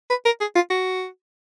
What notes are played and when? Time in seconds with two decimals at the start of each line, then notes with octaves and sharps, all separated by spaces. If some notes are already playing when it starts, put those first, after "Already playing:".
0.10 B4
0.26 A#4
0.41 G#4
0.56 F4
0.70 F#4